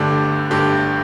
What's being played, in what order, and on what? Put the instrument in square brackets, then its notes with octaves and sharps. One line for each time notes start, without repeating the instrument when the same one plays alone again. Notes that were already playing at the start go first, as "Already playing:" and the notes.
Already playing: [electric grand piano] G1 G2 D3 A3 [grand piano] D4 G4
[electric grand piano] G1 G2 D3 A3 [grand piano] D4 G4